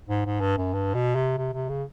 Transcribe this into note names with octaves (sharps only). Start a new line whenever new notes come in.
G#2
G#2
G2
F#2
G2
B2
C3
C3
C3
C#3